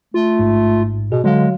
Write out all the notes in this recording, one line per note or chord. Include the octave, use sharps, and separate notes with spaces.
A3 F4
A1 G#2
B2 G#4
D3 F#3 G#3 F5